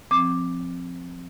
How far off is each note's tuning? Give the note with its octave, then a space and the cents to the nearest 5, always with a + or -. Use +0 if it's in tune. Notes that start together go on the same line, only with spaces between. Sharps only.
F3 +0 C4 +0 D6 +5